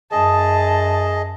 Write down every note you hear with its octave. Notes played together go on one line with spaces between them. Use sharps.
F#2 G#4 D#5 A5